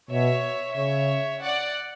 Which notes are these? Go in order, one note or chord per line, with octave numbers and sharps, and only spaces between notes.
B2 C#5 E5
C#3 C#5 E5
D5 F#5